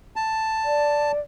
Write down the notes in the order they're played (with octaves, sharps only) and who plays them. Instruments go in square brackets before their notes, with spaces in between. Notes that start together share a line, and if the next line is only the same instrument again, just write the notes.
[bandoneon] A5
[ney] D5